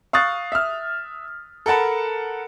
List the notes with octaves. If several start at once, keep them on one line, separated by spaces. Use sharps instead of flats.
F5 C#6 D#6 F#6 A6
E5 F6
A4 A#4 F#5 A5 B5